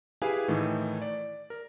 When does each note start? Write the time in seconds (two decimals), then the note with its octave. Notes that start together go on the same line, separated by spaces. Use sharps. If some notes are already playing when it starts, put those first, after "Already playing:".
0.22 E4 G4 G#4 B4 F5 G#5
0.48 A2 D#3 E3 A3 D#4
1.02 D5
1.50 A#4